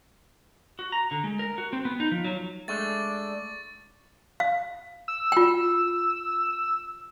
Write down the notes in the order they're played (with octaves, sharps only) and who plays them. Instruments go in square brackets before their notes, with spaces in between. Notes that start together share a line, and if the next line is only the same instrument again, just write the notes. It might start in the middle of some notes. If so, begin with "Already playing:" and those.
[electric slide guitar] F#4
A#5
D3
G#3
A#4
F#4
C4
B3
D#4
F3
F#3
[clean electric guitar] G#3 A3 D4 [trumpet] D5 [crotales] C#6 A6
[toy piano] F5
[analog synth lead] E6
[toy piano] F4 G5